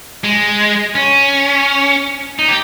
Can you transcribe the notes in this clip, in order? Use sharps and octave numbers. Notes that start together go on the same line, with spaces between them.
G#3
C#4
D#4
G4